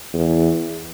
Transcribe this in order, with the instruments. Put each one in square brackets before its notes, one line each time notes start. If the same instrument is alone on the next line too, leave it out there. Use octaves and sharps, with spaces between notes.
[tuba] E2